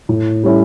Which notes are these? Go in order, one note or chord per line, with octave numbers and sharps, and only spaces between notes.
A2
G3 C#4 E4 A4